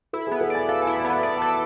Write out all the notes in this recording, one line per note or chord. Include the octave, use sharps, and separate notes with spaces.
E4 A4
B3 G#4
A4
D5 G#5
A4 F5
G#5
E4
B5
B3
B5
D5 B5
A5
A4